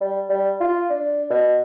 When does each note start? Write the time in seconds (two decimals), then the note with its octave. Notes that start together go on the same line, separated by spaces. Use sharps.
0.01 G3
0.29 G3
0.60 F4
0.89 D4
1.30 B2